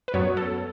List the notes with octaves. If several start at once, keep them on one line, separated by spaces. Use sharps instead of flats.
B4
F#2 F#3 B3 C#5
A4